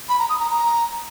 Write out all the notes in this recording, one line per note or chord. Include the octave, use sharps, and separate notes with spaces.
B5
A#5
D#6
A#5
A#5